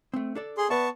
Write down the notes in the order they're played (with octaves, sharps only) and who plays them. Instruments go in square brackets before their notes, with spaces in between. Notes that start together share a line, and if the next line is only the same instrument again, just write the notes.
[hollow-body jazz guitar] A3 C4
D4 A4 D5
[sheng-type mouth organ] G#4 C6
[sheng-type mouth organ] B3 A5 C#6 [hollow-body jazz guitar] B4 D5 E5